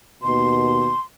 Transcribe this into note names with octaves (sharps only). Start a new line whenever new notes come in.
D#2 B2 C6